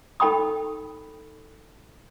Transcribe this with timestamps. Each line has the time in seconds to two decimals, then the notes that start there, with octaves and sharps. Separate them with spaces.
0.20 D#4 A4 G5 B5 D#6